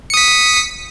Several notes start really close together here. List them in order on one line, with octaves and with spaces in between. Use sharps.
C#7 D#6 B6